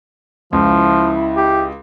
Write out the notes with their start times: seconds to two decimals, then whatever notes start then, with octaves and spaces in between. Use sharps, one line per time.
0.53 C#2 F3 E4
1.37 G4